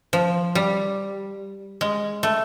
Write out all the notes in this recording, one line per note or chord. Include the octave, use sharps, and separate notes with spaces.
F3
G3
G#3
A3